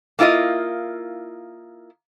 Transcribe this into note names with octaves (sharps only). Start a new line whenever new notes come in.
A#3 E4 F4 C5 D#5